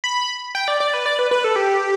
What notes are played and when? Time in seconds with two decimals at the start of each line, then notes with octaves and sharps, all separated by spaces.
0.04 B5
0.55 G5
0.68 D5
0.80 D5
0.94 B4
1.06 D5
1.19 B4
1.31 B4
1.44 A4
1.56 G4